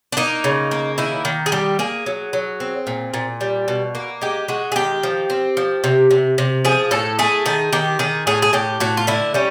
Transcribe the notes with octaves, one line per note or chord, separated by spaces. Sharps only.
D4
A#3 D#4
C#3
A#3
D#3 E4
D#3
G#4
G3 G4
A#3 G#4
F#3
F#3
C4
A#2
A#2
G3
B2
A#3
G#3 G4
G#3 F#4
G#4
D#3 G4
F3
C4
F3
C3
C3
C3
F3 G#4
A2 A4
A3 G#4
D#3 G#4
D#3 G4
D#3 G#4
A2 G#4
G#4
A2 G4
A2 F#4
F4
D3 E4
G3 C#4